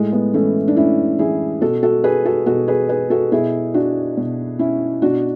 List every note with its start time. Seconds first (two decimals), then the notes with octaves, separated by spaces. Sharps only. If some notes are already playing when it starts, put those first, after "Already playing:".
Already playing: A2 G#3
0.12 G#3 B3
0.34 E3 A3 C#4
0.68 D4
0.76 A2 C#4 E4
1.19 E3 E4 G#4
1.61 B2 F#4 A4
1.83 F#4 A4
2.04 G#4 B4
2.25 F#4 A4
2.46 B2 F#4 A4
2.68 G#4 B4
2.89 G#4 B4
3.10 F#4 A4
3.32 B2 E4 G#4
3.74 D4 F#4
4.17 B2
4.59 C#4 E4
5.02 B2 D4 F#4